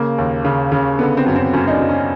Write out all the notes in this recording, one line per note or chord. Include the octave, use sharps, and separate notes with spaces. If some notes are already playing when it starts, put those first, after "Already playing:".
Already playing: C#3 A#3
D#2
C#3
C#3
D3 B3
C4
F#2
C4
F#2 C#4
D#4
D4
F#2
C#4